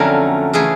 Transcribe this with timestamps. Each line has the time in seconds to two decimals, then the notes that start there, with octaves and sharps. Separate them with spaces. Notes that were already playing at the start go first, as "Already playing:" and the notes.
Already playing: F2 D3 F#3 A3 C#4 A#4
0.53 C#3 E3 A3 G#4